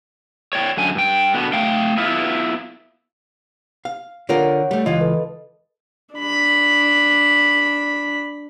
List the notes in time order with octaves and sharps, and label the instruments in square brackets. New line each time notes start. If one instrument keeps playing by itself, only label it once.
[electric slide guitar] C#5 D5 G5
F#2 D3 G#5
G2 G5
B2 D3 B3
A3 F5 G5
B3 E4 F4 B4
[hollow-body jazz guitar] F5
[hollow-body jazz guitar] D3 F4 A#4 [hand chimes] C#5 F#5
[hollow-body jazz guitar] G3 A3
[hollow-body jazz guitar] C#2 E3 F4 [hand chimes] D#5
[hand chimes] A4 B4
[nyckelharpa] D4 B5